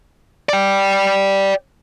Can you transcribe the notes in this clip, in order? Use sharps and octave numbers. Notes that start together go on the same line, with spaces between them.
D5 G5